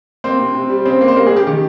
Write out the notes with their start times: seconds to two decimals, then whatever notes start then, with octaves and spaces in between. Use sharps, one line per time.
0.24 A#3 C4 C5
0.39 C3
0.55 C3
0.70 G3
0.85 C#3 C4 C5
1.01 A#3
1.08 C5
1.16 G3 A#3 A#4
1.27 G#4
1.32 C#3 G4
1.47 D#3 G4